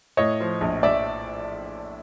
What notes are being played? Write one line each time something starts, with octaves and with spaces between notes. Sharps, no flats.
A2 C#5 D#5
F3
A#1
A#1 D5 E5